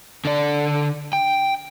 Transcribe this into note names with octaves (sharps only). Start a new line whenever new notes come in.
D3 D5
G5